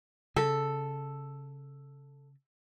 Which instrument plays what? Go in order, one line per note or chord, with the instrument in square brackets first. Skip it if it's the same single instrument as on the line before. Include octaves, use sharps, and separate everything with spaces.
[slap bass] C#3 [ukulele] A4